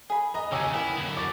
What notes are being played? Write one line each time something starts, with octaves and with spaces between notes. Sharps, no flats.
G#4 B5
B3 D#5 A#5
D#2 C#3 C#4 G4 G#5 E6
B3 E4 A#4
F#2 D3
F#4 D6 A6